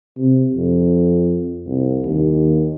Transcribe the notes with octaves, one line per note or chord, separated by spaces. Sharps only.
C3
F2
C2
D#2